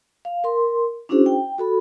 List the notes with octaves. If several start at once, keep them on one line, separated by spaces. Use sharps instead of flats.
F5
A#4 C6
C#4 D4 E4 F#4 G#4 C5
G5
F#4 A4 B5